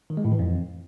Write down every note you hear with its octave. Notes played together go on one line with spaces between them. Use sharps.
D#3
G#3
A2
E3
F2